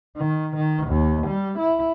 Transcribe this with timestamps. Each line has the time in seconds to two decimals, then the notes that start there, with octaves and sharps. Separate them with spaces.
0.17 D#3
0.56 D#3
0.87 D#2
1.27 G3
1.59 E4